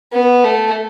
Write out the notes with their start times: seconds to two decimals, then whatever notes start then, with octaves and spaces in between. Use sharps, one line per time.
0.12 B3
0.44 A3